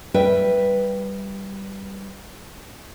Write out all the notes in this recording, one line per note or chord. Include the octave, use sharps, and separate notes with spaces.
G3 B4 E5 G5